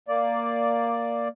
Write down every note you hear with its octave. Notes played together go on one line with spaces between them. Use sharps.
A#3 D5